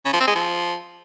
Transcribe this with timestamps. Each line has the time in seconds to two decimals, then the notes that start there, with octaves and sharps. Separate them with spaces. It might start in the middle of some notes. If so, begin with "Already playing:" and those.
0.06 C#3
0.13 F3
0.20 C4
0.28 G#3
0.35 F3